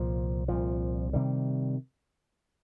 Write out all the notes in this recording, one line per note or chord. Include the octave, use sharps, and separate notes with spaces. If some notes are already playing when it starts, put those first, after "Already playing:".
Already playing: C2 A#2 F3
C2 A#2 F3
C3 D#3 G3